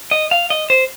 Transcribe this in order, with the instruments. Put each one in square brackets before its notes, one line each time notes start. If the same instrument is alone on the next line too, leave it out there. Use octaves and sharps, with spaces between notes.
[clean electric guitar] D#5
F5
D#5
C5